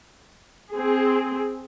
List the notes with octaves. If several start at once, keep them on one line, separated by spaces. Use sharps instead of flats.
C4 G#4